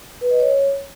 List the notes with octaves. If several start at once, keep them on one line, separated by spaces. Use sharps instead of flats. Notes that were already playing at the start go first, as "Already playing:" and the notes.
B4
D#5
C#5